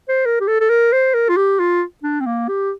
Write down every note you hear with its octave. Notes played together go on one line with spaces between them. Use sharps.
C5
A#4
G4
A4
A4
A#4
C5
A#4
F4
G4
F4
D4
C4
A#3
G4